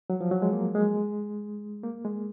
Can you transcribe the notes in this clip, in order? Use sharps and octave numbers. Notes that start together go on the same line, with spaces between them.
F#3
F3
F#3
G#3
A#3
G#3
A#3
G#3